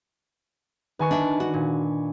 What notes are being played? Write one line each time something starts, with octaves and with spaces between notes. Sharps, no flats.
D#3 B4 G#5 C#6
D4 E5
D4 F#4
A#2